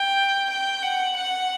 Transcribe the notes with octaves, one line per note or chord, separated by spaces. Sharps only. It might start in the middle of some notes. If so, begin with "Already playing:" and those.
Already playing: G5
G5
F#5
F#5